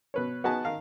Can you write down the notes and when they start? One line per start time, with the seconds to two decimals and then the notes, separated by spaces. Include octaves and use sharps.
0.14 B2 B4 C#5
0.44 B3 D#4 F#4 G#4 G#5 A5
0.65 D#3 D#4 A#4 F5